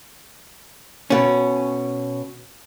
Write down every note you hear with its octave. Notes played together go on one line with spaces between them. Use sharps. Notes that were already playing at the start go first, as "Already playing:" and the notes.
B2 C#4